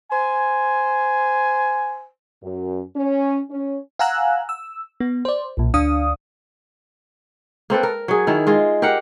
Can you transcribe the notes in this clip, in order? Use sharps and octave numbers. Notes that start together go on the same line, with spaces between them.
C5 G#5
F#2
C#4
C#4
F5 F#5 G#5 A#5 E6 F#6
E6
B3
C5 D5
B1 A#2
D2 D4 F5 D#6
A#3 C4 A4 B4
A#4
F#3 G#4
D#3 E4 A#4
G#3 F4
G4 A#4 F5 F#5